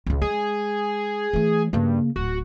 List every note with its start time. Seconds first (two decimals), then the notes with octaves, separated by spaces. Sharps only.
0.07 C#2 C#3
0.22 G#3 G#4
1.33 E3 A3
1.73 G2 C#3 A#3
2.16 D1 F#4